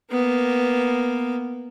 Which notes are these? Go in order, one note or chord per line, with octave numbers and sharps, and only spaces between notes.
A#3 B3